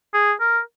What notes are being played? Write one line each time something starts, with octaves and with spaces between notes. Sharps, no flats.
G#4
A#4